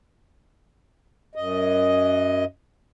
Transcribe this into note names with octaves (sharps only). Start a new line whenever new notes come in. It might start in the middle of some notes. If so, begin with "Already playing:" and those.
F#2 D#5